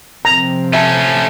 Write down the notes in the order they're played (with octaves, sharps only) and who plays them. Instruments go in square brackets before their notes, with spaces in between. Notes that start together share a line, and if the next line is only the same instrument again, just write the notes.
[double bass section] C3 F3 C4 [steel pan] A#5
[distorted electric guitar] A3 C#4 [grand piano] E5 A5